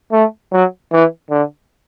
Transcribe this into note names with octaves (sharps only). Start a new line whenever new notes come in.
A3
F#3
E3
D3